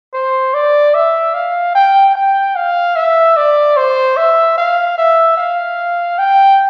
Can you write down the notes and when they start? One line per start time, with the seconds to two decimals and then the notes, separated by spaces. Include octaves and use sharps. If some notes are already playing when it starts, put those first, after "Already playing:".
0.14 C5
0.54 D5
0.94 E5
1.34 F5
1.75 G5
2.16 G5
2.56 F5
2.96 E5
3.37 D5
3.77 C5
4.17 E5
4.58 F5
4.98 E5
5.38 F5
6.19 G5